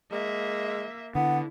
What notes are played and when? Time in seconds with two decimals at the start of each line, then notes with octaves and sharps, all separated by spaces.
0.12 G#3 A#3 E5
1.15 D3 B3 E4 F#5